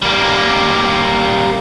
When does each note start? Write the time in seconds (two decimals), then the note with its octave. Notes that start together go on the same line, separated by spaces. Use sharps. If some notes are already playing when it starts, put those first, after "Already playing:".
0.02 G3 A#3